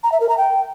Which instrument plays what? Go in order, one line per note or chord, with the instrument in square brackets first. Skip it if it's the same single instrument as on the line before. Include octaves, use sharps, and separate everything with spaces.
[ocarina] A#5
E5
A#4
A#5
G5